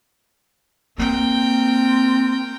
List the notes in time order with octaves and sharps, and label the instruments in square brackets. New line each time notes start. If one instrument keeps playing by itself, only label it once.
[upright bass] A#3 [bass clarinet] C4 [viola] A#4 G5